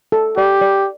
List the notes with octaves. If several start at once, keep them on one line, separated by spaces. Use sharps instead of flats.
A4
G4 D5
D5